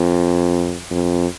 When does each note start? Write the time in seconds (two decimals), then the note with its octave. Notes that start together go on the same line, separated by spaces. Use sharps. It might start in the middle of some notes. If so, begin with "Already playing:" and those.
Already playing: F2
0.91 F2